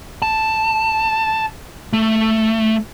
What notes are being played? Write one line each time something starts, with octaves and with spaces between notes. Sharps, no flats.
A5
A3